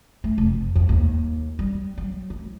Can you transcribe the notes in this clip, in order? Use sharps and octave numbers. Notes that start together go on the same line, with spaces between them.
A3
F1
F2
D#2
G3
F#3
E4